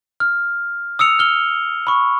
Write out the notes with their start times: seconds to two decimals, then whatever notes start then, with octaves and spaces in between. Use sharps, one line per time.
0.20 F6
0.99 D#6 E6 C#7 F7
1.19 F6 G7
1.87 B5 C#6